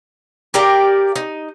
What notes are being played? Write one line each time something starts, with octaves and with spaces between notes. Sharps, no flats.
G4 A#4 D5 F5
D#4